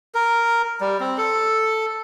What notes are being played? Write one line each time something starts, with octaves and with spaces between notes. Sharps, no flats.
A#4
G3
C4
A4